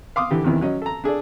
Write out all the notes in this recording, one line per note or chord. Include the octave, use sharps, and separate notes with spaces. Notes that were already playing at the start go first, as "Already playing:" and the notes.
F5 C6 D6 D#6
D3 E3 G4
E2 C3 D#3 E3
F#3 C#4 D#5
A4 A#5
D4 G#4 A4 D5